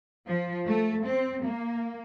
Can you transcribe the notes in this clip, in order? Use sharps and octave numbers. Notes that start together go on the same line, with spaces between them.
F3
A3
C4
A#3